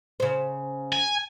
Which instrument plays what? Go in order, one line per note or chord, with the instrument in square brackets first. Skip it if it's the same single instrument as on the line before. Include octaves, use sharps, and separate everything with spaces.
[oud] C#3 C5
[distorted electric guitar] G#5